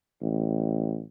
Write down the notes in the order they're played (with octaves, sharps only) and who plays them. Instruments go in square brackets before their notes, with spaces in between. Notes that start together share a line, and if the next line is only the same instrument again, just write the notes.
[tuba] A1